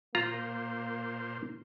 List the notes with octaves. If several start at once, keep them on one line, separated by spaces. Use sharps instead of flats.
A#2 A#3 F4 C5 A#5